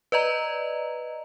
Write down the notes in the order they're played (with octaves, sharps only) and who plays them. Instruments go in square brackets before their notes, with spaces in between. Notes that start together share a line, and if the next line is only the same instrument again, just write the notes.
[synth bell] B4 D5 D#5 A#5